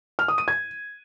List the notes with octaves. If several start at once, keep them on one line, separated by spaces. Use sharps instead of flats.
F6
D#6
D#7
G#6